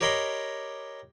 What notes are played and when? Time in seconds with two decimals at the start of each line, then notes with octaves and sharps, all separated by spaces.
0.01 G4 A#4 C#5 D#5 B5 C6